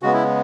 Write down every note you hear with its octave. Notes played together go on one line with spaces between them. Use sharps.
C#3 G#3 B3 F#4
E4